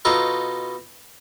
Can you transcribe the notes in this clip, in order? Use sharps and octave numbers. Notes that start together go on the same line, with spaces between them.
B2 D#4 F4 A4 C#6